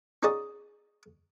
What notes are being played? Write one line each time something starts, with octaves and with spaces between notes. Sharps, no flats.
C#4 D#4 F#4 G#4 D5 D#5